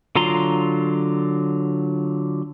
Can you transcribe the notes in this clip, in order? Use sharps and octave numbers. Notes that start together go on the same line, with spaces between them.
D3 F#3 F4 A#5 C6